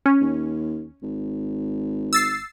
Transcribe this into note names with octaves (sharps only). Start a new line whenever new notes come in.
C#4
D#2
G#1
E6 A6 C7